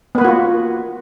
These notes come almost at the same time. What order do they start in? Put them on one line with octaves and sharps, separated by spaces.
B3 B4 A#3 F#4 F4